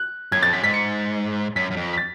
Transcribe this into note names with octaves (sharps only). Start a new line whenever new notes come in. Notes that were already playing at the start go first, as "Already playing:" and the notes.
Already playing: F#6
F#2 G#6
F2 A6
F#2 B6
G#2 B6
C#7
F#2 B6
F#2
F2
B6
A6